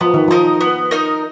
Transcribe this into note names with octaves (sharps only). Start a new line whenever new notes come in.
F3 B3
D#3
F3 D#4 A#4 D#5
B3
D#4 A#4 D#5